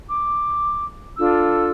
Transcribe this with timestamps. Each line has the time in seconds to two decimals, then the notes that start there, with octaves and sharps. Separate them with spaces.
0.10 D6
1.18 D4 F4 A4 E6